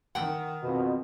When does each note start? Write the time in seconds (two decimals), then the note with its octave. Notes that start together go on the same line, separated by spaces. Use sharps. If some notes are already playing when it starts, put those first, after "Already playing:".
0.15 D#3 F#5 G5
0.63 F2 B2